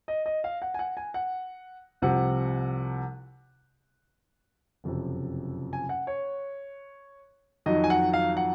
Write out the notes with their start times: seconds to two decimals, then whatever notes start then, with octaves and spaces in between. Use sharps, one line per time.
0.08 D#5
0.26 D#5
0.44 F5
0.62 F#5
0.74 G#5
0.79 F#5
0.97 G#5
1.14 F#5
2.02 C2 C3 F3 F#5
4.84 F#1 F2 C3
5.73 G#5
5.89 F#5
6.07 C#5
7.66 F2 D#3 F#3 D#5
7.84 G#5
7.90 F#5
8.13 F5
8.37 F#5